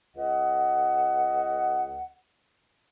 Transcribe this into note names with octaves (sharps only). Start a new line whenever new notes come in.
C#2 D#5 F#5